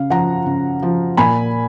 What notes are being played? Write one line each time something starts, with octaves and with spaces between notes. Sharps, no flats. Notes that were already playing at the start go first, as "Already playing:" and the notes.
Already playing: C#3 F5
F3 F#5 A#5
C#3
F3
A#2 G#5 B5